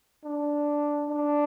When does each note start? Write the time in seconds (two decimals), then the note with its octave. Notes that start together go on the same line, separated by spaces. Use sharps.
0.24 D4
1.09 D4